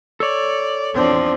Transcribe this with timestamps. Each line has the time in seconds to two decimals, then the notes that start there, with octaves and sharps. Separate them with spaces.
0.20 A4 C#5 D5
0.95 E2 F3 C4 D4